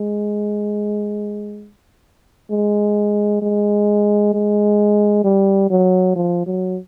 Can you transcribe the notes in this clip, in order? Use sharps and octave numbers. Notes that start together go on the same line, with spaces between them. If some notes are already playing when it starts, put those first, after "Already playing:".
Already playing: G#3
G#3
G#3
G#3
G3
F#3
F3
F#3